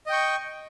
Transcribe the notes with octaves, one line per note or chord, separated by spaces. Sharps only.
D#5 G5 C#6